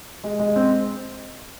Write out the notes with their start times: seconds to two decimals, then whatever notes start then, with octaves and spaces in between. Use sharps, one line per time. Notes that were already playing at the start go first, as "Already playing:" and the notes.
0.24 G#3
0.39 G#3
0.56 C4